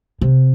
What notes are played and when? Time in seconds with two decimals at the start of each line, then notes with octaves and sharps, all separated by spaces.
0.21 C3